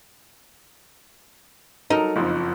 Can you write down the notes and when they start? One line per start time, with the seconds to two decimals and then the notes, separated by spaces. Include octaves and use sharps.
1.90 F#3 D#4 A4 A#4
2.16 F#1 F2 F3